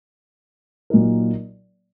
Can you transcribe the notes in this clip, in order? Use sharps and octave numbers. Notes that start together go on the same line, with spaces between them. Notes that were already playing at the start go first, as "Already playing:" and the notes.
A#2 F#3 A#3 D#4 A#4